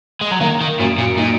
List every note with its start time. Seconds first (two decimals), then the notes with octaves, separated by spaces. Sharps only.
0.21 G#3
0.31 F#3
0.41 D#3 A#3
0.61 D#3
0.79 F#2 A#2
0.98 A#2
1.17 A#2 D#4